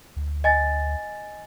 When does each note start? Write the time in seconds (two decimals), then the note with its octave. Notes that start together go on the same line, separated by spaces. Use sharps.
0.16 D2
0.44 D#5 G#5 A6